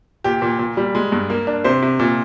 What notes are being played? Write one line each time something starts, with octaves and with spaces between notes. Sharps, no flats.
A#2 G4
A#2
A#2
G3
G#3
G2
A#3
D4
C3 C5
C3
A#2